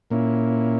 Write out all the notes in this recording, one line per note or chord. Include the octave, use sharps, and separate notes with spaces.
A#2 A#3 C#4 E4